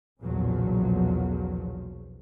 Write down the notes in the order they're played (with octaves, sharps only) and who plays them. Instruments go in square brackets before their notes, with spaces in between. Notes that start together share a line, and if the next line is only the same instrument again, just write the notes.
[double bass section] B1 E2 A#2 C#3 F3 F#3